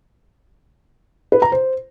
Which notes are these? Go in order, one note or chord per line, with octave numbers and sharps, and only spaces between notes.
B4
A#5
C5